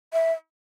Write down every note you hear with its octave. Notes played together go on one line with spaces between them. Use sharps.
E5